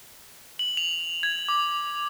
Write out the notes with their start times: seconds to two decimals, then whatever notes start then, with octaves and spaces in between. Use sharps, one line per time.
0.59 F#7
0.77 F7
1.23 G#6
1.48 D6